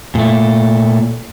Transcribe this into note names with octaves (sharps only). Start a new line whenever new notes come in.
A#2 A3